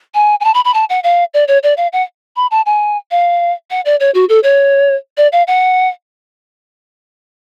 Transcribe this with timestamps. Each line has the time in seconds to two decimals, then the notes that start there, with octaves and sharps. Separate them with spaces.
0.14 G#5
0.40 G#5
0.44 A5
0.54 B5
0.65 B5
0.74 A5
0.89 F#5
1.04 F5
1.34 D5
1.48 C#5
1.63 D5
1.77 F5
1.93 F#5
2.36 B5
2.51 A5
2.66 G#5
3.11 F5
3.71 F#5
3.85 D5
4.00 C#5
4.14 F#4
4.29 A4
4.43 C#5
5.17 D5
5.32 F5
5.47 F#5